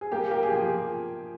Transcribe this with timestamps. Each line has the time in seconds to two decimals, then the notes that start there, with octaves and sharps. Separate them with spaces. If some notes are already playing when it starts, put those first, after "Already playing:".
0.01 G#4
0.12 A#3 G4
0.31 A#3 G4
0.43 G#4
0.50 F3 G4